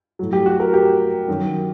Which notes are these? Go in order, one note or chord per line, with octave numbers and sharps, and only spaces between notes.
A2 F#3
G4
F#4
A#4
G4
F#2 D#3 F#3